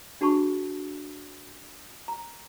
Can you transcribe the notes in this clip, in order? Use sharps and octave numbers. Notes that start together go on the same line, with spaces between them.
D4 F#4 G#4 A5 B5 C#6
A#5